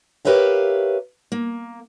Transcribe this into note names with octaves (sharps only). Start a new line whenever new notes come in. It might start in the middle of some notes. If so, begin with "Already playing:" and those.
G4 A#4 B4 C#5 E5 F5
A#3